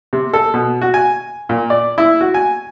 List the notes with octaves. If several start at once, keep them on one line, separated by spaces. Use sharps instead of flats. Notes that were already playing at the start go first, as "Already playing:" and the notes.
C3
A4
B2
F#4
G#5
A#2
D5
E4
F#4
G#5